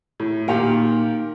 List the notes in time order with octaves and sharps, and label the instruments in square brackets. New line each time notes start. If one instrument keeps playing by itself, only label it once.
[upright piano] A2
[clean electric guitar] A#2 F5 [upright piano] D#3 G4 A#4